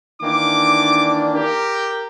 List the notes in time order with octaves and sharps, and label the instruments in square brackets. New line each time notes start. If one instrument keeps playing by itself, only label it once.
[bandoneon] D#3 E3 A#3 [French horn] D4 [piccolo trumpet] D6
[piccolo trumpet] G4 [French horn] A#4